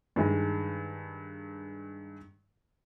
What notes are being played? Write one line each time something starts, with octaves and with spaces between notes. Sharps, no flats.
G2 D#3 G#3